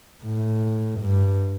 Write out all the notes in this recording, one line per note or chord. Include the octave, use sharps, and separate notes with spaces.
A2
G2